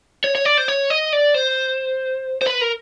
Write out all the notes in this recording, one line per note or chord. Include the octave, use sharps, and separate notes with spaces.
C#5
C#5
D5
C5
C#5
D#5
D5
C5
C5
B4
A#4